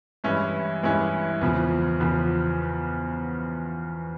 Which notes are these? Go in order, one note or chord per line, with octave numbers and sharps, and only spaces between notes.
G2 E3 G#3 C#4 E4
G2 E3 G#3 C#4 E4
E2 C#3 F3
E2 C#3 F3